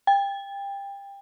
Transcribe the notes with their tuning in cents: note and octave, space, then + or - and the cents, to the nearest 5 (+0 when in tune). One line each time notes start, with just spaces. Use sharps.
G5 +25